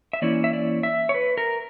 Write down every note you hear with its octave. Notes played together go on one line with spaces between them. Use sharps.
E5
E3 A#3 C#4 E4 D5
E5
D5
E5
C#5
B4
A#4